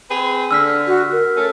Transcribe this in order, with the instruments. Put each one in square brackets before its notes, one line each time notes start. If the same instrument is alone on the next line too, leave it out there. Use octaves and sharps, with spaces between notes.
[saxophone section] C4 G#4 B4
[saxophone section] D3 [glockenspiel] E6 F6 B6
[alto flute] F#4
A#4
[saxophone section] A3 C#4 A4